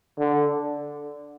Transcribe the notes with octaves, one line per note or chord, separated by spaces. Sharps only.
D3